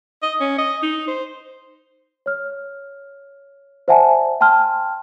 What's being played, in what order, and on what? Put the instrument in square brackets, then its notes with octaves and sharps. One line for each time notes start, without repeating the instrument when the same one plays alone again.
[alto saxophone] D#5
C#4
D#5
D#4
C5
[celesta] C#5 F6
C5 D5 E5 F#5 G#5 A5
G5 A5 C6 F6